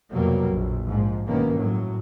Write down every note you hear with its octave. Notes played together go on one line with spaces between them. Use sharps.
C2 F2 B2 F#3 G3 A#3
A#1
G#2 F3
G1 B2 D#3 A#3 C#4
A2 F#3